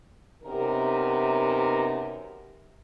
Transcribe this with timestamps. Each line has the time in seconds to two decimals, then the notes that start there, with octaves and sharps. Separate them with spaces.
0.43 F#2 C3 B3 D#4 A#4